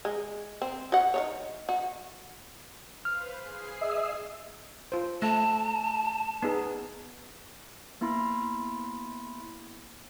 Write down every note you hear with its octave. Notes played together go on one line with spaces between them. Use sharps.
G#3
C4
F#4 F#5
D#3 E3 C#5
F#4
B4 C5 F5 F6
G#4 C7
D#5 E5
F4 C5
A3 A5
B3 D#4 G#4
A#3 B3 E4 B5 C6